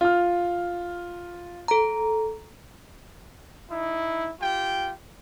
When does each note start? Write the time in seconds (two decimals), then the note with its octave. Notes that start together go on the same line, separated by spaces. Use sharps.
0.01 F4 F6
1.68 A4 A#5
3.71 D#4 E4
4.40 F4 G4 G5